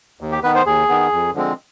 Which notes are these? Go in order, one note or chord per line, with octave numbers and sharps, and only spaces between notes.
D#2
G4
D#3 B3 B4
C5
D#2 G#4
D#3 B3
F2
D3 F3 G#3 C4